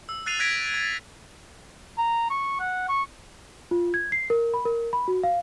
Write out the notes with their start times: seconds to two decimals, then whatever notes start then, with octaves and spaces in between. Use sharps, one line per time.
0.09 E6
0.26 F#6 A6 C7 D#7 F7
0.39 F#6 G#6 A#6 B6 D7
0.74 A6
1.98 A#5
2.30 C#6
2.60 F#5
2.89 C#6
3.71 F4
3.94 G#6
4.12 C7
4.30 A#4
4.54 B5
4.65 A#4
4.93 B5
5.08 F#4
5.24 F5